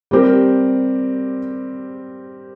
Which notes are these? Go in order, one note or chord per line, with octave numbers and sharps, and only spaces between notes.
G3 C4 G4 A#4